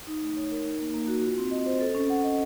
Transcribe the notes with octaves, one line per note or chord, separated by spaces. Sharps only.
D#4
A3
C#5
A#4
D#4
A#3
A#3
F#4
F4
C4
D#5
C5
A4
C#4
F#5
D#5